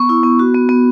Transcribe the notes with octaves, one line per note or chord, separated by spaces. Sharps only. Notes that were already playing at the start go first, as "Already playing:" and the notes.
Already playing: B3 C#6
E4
B3
F#4
B3
B3